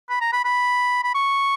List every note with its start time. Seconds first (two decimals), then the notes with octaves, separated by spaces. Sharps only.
0.10 B5
0.21 A#5
0.33 B5
0.45 B5
1.04 B5
1.15 C#6